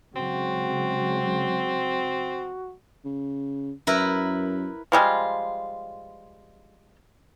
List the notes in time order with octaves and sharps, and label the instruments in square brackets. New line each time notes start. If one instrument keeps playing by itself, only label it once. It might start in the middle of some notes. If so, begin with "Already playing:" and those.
[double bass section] C#3 F#3 G#3 [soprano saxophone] C4 [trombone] F#4
[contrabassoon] C#3
[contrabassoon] F#2 [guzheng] E4 A#4 B4
[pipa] F3 G3 G#3 F4